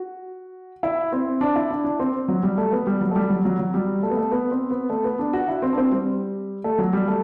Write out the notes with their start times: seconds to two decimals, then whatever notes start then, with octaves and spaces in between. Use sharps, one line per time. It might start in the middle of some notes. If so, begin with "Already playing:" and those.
Already playing: F#4
0.83 E4
1.12 C4
1.41 D4
1.56 E4
1.71 D4
1.84 D4
2.00 C4
2.28 F#3
2.43 G3
2.58 A3
2.72 B3
2.87 G3
3.01 F#3
3.11 A3
3.16 G3
3.30 F#3
3.45 F#3
3.59 F#3
3.74 G3
4.03 A3
4.10 B3
4.17 A3
4.32 B3
4.51 C4
4.71 B3
4.90 A3
5.04 B3
5.19 D4
5.33 F#4
5.48 E4
5.62 C4
5.73 D4
5.78 C4
5.92 G3
6.64 A3
6.79 F#3
6.93 G3
7.08 A3